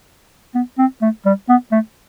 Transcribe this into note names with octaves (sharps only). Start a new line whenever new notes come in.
B3
C4
A3
G3
B3
A3